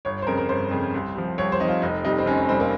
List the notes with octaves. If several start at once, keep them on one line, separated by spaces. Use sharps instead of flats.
G1 C#5
C5
F2 C#3 A#4
A#4
G1 C5
F2 C#3
C2
C3 F3
C2 C#5
C5
C3 D#4
F3 F4
F1 D#4
F2 C3 G3 D#4
C4
F1 C#4
C#4
F2 C3 G3 C4
A#3